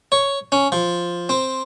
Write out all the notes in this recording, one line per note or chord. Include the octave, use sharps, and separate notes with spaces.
C#5
C#4
F3
C4